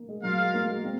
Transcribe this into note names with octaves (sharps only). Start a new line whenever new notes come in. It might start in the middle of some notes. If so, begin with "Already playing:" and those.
Already playing: A#3
G#3
F#3 F4 A#4 F5
G#3
A#3
G#3
C4